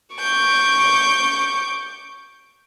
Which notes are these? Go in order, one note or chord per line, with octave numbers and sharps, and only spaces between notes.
C#6 D6 G6